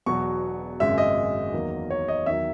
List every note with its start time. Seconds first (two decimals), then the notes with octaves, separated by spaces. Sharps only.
0.06 E1 E2 B2 F#3 C#6
0.80 G#1 F#2 C#3 G#3 E5
0.98 D#5
1.53 E2 D#3 F#3 A#3
1.90 C#5
2.08 D#5
2.26 E2 D#3 F#3 E5